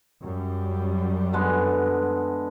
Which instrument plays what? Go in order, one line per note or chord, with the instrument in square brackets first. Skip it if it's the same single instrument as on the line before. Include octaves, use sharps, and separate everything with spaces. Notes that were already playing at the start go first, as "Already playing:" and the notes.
[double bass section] F#2 G3
[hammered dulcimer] D3 G#3 B3